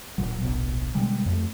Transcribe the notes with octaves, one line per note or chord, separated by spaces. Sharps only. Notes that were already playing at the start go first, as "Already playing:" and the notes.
D1 A#1 A#2 F#3
D1 A#1 B2
B2 D3 G3 G#3
F2 A3